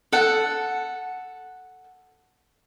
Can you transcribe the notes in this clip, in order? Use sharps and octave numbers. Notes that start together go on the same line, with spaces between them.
A4 F#5